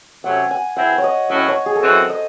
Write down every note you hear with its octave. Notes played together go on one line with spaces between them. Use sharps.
C3 F#3 A3 C#4 F#5
G#5
E3 C4 E4 G#4 F#5
C#5
D#5
A2 F#3 C#4 F#4 D#5
C#5
G#4
A4
F#2 E3 C4 F#4 C5
D#5